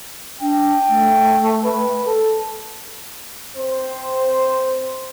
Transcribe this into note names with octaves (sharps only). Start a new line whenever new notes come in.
D4 G5
A3
B4
A4
C4 C5